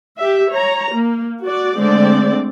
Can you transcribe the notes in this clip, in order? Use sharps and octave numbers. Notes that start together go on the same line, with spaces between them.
G4 E5
C#5 A#5
A#3
F#4 D5
D3 G#3 A3 C4 D5